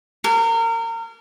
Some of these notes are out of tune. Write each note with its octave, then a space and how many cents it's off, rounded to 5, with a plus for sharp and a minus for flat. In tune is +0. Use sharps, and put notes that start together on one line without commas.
A#4 -30